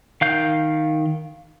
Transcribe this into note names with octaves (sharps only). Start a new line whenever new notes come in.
D#3 F5 G6